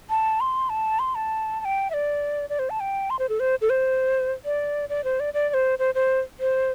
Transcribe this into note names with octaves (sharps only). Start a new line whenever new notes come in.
A5
C6
A5
C6
A5
A5
G5
E5
D5
D5
C5
A5
G5
C6
C5
A4
C5
A4
C5
D5
D5
C5
D5
D5
D5
C5
C5
C5
C5